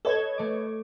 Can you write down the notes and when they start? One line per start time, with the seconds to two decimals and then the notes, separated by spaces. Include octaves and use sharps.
0.05 A4 B4 C#5 D#5 G#6
0.38 A3 D6